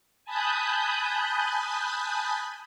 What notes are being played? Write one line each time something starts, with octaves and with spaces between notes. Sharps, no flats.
G#5 A5 B5 D#6 F#6 G6